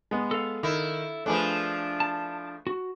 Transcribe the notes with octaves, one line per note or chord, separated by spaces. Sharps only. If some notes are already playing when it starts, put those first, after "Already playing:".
G#3 B3
A4 F5
D#3 E4
F3 A3 D4 G#4 B4
A5
F#4